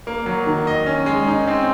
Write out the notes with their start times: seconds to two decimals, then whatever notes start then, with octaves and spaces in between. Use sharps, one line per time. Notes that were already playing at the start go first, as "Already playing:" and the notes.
0.07 A#3
0.26 F#3
0.46 D#3
0.67 D#5
0.86 C#4
1.06 G#3
1.27 D#4
1.48 C4